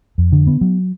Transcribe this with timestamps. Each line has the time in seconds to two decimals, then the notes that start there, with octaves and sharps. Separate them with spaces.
0.18 F2
0.32 D3
0.47 B3
0.61 F#3